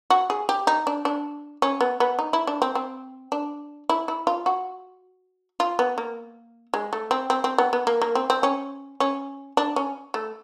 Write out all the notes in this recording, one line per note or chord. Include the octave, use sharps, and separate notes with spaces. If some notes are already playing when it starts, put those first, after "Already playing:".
F#4
G#4
G4
D#4
D4
D4
C#4
B3
B3
D#4
E4
D4
C4
C4
D4
E4
E4
F4
F#4
F4
B3
A#3
G#3
A3
C4
C4
C4
B3
B3
A#3
A#3
C4
C4
C#4
C#4
D4
C#4
A3